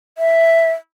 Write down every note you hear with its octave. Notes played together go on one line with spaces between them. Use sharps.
E5